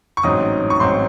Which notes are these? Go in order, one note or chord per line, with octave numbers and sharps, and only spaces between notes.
C#6
A1 G#2 F#3 C4 D#4 D#6
C#6
A1 G#2 F#3 C4 D#4 C6